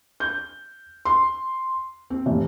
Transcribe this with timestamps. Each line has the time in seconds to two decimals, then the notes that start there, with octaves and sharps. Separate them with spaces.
0.20 G6
1.05 C6
2.10 C4
2.26 F1